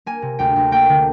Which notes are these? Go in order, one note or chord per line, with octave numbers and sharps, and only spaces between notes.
A#3 G#5
C3
D2 G5
D2
A#3 G5
D3